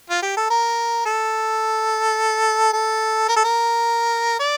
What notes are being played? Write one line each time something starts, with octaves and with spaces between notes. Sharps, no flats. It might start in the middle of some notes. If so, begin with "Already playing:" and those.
F4
G4
A4
A#4
A4
A4
A#4
A4
A#4
D5